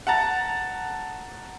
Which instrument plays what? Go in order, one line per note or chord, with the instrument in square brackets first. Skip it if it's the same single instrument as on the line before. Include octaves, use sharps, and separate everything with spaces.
[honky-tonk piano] F#5 A5 A#5 A6